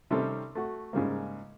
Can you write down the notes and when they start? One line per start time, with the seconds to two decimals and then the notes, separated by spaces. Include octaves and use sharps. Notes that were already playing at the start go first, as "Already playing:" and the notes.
0.11 C3 D#3 G3 C4 C#4 A4
0.55 A3 F#4
0.93 G#2 C#3 G3 A#3